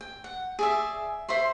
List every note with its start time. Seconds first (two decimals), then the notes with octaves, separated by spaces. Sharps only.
0.01 G5
0.24 F#5
0.59 G#4 D5 E5
1.29 C5 E5 B5 C6